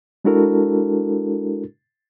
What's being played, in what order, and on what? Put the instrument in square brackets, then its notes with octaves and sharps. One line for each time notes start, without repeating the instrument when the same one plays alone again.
[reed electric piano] G#3 D4 E4 F#4 A4 A#4